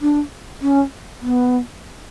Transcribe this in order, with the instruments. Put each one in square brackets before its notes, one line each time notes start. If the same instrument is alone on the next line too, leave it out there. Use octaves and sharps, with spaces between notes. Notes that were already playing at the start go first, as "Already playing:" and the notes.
[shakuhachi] D4
C#4
B3